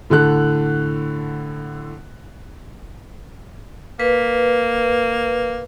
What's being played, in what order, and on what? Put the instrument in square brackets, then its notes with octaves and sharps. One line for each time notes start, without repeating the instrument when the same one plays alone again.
[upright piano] A2 D3 A4 F#6
[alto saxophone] A#3 [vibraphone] B4